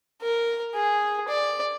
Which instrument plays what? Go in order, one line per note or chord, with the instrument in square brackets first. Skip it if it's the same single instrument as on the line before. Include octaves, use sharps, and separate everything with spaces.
[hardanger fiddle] A#4
G#4
D5